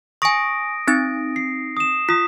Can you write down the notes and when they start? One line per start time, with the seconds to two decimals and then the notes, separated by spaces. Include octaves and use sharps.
0.22 G#5 C#6 D#6 A#6 D7
0.88 C4 D#4 A6
1.36 C7
1.77 D#6 E7
2.09 F4 D#6 B6